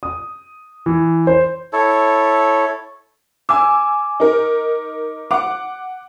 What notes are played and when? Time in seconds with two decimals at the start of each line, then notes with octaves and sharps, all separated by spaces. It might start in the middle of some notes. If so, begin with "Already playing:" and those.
0.03 D#6
0.86 E3
1.27 C5
1.73 E4 A4 C#5
3.49 G#5 D6 E6
4.20 D#4 A#4
5.31 F#5 D6